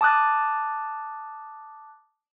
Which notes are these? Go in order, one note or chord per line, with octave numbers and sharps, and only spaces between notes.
A5 D6 D#6 F#6 A6